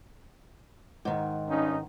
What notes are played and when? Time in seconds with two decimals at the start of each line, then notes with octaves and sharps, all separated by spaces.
1.05 G#2 D#3
1.49 G2 C#4 D#4